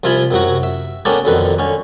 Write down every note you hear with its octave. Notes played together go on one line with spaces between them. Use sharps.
C2 F3 F4 E5 G#5 B5
F#2 C3 F#3 F#4
E5
A#3 B3 C#4 D4 G4 A4
B1 F2 D3 D#3 B4
D3 C#4